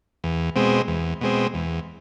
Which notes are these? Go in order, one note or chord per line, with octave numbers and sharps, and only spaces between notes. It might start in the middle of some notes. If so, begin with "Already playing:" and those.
E2
B2 G#3 C4
E2
B2 G#3 C4
E2